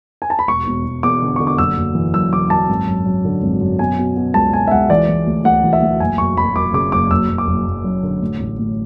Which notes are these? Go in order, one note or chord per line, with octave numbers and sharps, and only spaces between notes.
G#5
A5
B5
E1 C#6
E1
E1
E2 D6
D3
D3 C#6
D6
F#1 E6
F#1
E3
F#2 E6
E3 D6
F#2 A5
G#1
F#2
F#2
D3
G#1
F#2
B2 G#5
B2
B2
C#2 A5
B2 G#5
E5
C#2 F#5
E3 D5
E3
D2
D2 F#5
E3
E5
D2
F#1 G#5
F#1 C#6
F#1 B5
F#1 D6
C#3 D6
F#1 D6
F#1 E6
F#1
D6
F#1
F#1
F#2
D3
A2
A1
A2